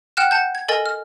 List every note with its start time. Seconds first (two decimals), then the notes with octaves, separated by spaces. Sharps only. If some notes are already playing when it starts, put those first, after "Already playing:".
0.17 F#5 G5 F6 F#6 E7
0.31 F#5 A5 G6
0.55 G#6
0.68 A4 A#4 D#5 G#5 A6
0.86 F6